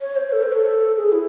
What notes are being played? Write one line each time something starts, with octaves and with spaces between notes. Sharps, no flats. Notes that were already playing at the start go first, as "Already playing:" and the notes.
C#5
C5
A4
C5
A4
G#4
E4